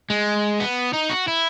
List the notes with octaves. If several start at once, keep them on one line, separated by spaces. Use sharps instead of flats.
G#3
B3
D#4
F#4
E4